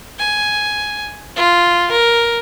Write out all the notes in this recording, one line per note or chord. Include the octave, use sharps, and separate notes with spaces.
G#5
F4
A#4